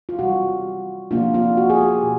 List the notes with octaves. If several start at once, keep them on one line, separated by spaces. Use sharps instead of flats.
F4
C3 E3 G3 F#4
C3 F3 A#3 D4 F4
F4
F#4
G#4
G4
B2